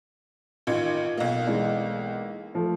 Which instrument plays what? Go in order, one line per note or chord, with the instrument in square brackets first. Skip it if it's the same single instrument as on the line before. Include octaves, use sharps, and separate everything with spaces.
[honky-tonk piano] A1 D#3 G#6 [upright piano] F4
[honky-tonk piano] B1 A#3
[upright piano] E3 G#3 D5
F3 A3